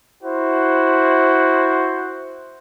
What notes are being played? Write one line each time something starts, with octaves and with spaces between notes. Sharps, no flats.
E4 F#4 C5